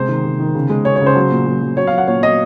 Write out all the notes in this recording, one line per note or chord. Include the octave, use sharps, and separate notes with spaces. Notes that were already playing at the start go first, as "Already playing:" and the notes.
Already playing: C3 G#3 C5
D#3
C3
D#3
C#3
G#3
G#3 C#5
C#5
C#3
C5
F#3
A#2
F#3
F#3
F#3 C#5
F5
F#3
F#5
A#2 C#5
F#3 D#5